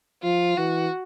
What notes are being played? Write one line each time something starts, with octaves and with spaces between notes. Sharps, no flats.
F3 F4
E3 F#4